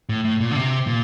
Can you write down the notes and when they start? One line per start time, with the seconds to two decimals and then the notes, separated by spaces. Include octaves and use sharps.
0.09 A2
0.25 A2
0.41 A#2
0.51 D3
0.57 C3
0.87 A#2